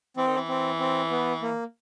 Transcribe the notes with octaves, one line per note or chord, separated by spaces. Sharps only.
E3 C4
D#3
E3
C4
C4
B3
A#3